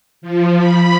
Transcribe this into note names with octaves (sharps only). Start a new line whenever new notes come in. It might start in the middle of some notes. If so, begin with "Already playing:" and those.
F3
B5